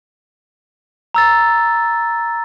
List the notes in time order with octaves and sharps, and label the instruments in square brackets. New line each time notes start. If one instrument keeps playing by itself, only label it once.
[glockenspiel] A#5 E6 A6